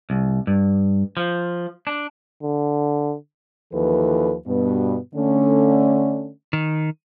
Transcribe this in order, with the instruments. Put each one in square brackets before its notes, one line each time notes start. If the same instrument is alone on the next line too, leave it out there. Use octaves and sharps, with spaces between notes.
[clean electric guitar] C2
G2
F3
D4
[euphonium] D3
[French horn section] D#2 E3 F3 A4 B4
G2 B2 B3
D3 A3 C#4
[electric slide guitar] D#3